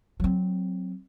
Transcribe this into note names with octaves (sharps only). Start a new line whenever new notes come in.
F#3 C4